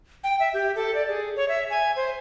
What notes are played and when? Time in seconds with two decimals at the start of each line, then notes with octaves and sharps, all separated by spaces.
0.24 G5
0.40 E5
0.54 G4
0.76 A4
0.95 D5
1.08 G#4
1.36 C#5
1.48 E5
1.70 G#5
1.96 C5